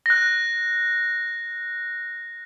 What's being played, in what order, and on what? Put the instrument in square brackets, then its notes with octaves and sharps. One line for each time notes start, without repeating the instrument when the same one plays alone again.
[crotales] F#6 A#6